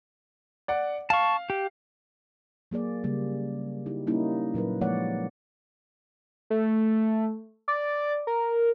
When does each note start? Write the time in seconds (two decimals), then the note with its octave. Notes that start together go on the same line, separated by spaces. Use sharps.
0.68 D5 F#5
1.10 F5 A5 C#6
1.50 G4
2.71 F#3 A#3 G#4 D5
3.04 C#3 G3 A#3
3.86 D#4 E4 G4
4.07 G3 A#3 C#4 D#4 E4
4.54 A#2 F#3 A#4 B4
4.81 F3 G#3 A#3 C#5 D5 F#5
6.50 A3
7.68 D5
8.27 A#4